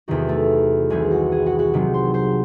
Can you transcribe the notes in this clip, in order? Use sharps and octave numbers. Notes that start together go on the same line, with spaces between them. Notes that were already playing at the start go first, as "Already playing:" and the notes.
E2 C3 D#3 F#4
A3 A4
C2 C3 E3 C4 G#4 G#5
F#4 F#5
G#4 G#5
F#4 F#5
F#4 F#5
C3 D#3 F#3 C4
C5 C6
C5 C6